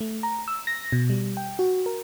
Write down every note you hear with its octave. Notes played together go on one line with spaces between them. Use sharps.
A3
A#5
E6
A#6
B2
G3
G5
F#4
A#4